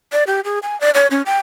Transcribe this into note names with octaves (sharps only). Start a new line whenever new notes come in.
D5
G4
G#4
G#5
D5
C#5
C#4
G5